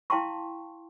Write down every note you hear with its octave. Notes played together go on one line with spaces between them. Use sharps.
E4 F5 G5 A5 C6 C#6